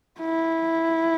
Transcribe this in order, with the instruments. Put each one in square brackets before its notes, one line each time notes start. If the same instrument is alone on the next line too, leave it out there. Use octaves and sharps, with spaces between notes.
[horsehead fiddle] E4